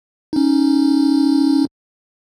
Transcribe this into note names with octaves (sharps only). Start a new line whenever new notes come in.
C#4 D#4